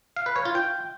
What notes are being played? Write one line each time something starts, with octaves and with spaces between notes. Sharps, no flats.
F5
B4
C#5
F4
G5